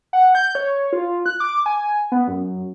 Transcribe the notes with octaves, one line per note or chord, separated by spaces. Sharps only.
F#5
G6
C#5
F4
F#6
D6
G#5
B3
F#2